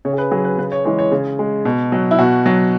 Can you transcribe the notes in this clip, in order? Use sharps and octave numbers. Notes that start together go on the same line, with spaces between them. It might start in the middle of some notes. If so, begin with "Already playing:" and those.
C#3 C#5
G#4
B4
F#3 G#4
B4
C#3 B4
C#5
E3 G#3 C#5
C#5
C#3
G#3
B2
F#3
E4
B2 F#4
F#3